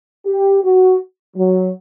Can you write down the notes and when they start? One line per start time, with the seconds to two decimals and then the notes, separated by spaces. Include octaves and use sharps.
0.27 G4
0.64 F#4
1.37 F#3